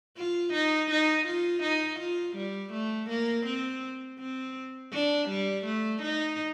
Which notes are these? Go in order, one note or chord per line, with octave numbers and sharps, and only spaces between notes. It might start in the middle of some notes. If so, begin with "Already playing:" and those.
F4
D#4
D#4
F4
D#4
F4
G3
A3
A#3
C4
C4
D4
G3
A3
D#4